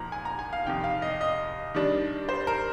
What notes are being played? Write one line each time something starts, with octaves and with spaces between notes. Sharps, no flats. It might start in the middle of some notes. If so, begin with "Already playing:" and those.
Already playing: A#2 F3 D#4 A#5
G#5
A#5
G#5
F5
F2 C3 D#3 G5
F5
D#5
D#5
D#3 G3 D4
C5
A#4